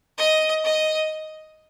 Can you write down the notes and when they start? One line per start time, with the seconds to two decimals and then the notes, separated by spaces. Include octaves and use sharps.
0.18 D#5
0.65 D#5